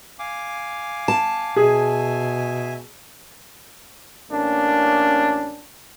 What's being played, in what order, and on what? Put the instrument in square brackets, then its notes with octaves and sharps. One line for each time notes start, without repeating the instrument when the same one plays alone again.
[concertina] F5 G#5 D6
[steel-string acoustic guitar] A5
[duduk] B2 [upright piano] G#4 [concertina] E5 G#5
[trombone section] A1 A#3 C#4 D4